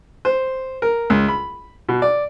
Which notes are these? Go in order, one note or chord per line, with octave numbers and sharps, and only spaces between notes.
C5
A#4
C#2
B5
B2
D5